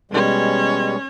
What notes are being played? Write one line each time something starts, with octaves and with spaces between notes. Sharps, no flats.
B2 G3 G#3 C#4 C#5